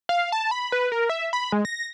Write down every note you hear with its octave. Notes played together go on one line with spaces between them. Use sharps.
F5
A5
B5
B4
A#4
E5
B5
G#3
A#6